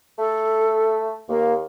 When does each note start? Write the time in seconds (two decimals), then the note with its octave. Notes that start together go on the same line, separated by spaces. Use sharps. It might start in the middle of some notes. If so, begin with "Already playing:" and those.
0.19 A3 A4
1.29 D#2 A#3